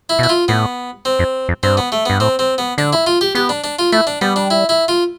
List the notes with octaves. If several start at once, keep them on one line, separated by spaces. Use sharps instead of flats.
E4
B2
E4
F4
A2 B3
C4
F2
F2
G2 C4
B3
A3
G2 B3
A2 C4
C4
B3
D3 D4
E4
F4
G4
B3 G4
D4
D4
F4
A3 E4
D4
G3 B3
D4
E4
E4
F4